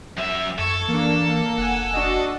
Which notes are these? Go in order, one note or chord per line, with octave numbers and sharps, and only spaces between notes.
F#2 E5
F#2 A4 C#6 G#6
E3 A#3 D4
A#3
F1 F#5 G#5
D4 F#4 D#5